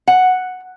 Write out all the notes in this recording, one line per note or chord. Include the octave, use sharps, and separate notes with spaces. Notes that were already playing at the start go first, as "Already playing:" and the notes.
F#5